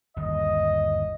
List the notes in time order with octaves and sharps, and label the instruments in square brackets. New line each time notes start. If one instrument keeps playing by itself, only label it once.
[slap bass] G1 D#2 [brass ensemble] D#5